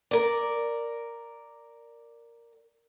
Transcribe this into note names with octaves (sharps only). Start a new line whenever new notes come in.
A#4 D5